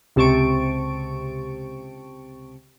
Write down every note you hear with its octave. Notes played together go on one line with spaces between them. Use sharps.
C#2 C3 C4 A5 C#6 D7